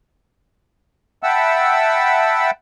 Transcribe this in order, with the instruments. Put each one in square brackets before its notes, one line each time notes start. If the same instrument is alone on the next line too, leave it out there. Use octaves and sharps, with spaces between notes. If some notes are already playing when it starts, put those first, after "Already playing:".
[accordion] E5 F#5 G5 A5 B5 E6